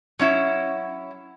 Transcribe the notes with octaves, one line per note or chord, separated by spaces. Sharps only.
F#3 C#4 E4